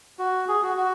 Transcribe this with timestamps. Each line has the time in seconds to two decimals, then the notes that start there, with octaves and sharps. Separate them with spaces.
0.19 F#4
0.48 G#4
0.63 F#4
0.77 F#4